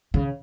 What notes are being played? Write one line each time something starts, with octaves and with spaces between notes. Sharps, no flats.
C#3